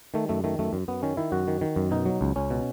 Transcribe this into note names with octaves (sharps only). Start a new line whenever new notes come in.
D#3 A3
F#2 A3
D#3 A3
F#2 A3
F#2
F#2 B3
D#3 C#4
D#3 E4
F#2 F#4
D#3
D#3
F#2
B2 D#4
F#3
C#2
C#2 C#4
B2